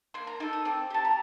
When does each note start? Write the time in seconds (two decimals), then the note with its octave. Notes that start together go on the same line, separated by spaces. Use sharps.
0.14 A#3 C6
0.27 A#5
0.40 D#4 A4 D6
0.53 D#6
0.65 C4 D6
0.90 G4 A5
1.05 A#5